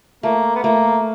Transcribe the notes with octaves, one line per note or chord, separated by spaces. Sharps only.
A3 A#3
B3
A3 A#3